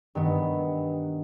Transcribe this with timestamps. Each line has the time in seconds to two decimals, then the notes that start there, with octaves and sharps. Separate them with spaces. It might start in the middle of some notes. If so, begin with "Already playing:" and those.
0.15 G2 D#3 B3